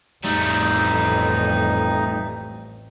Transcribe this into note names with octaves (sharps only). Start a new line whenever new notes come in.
A1 F2 G3 A3 D#4